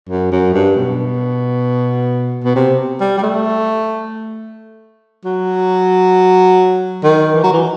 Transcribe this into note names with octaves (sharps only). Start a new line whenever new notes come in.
F#2
F#2
G2
B2
B2
C3
G3
G3
A3
F#3
D#3
E3
F#3
E3